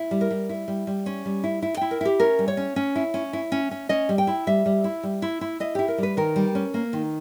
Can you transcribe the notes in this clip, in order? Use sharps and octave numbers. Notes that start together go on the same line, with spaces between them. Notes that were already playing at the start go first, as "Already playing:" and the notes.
Already playing: E4
G3
A#4
G3
E4
G3
G3
C#4
G3
E4
E4
E4 G5
A#4
E4 G4
C#4 A#4
G3
C#5
C#4
C#4
E4
C#4
E4
C#4
C#4
C#4 D#5
G3
G5
E4
G3 E5
G3
E4
G3
E4
E4
E4 D#5
E4 G4
A#4
G3 B4
D#3 A#4
G3
C#4
A#3
D#3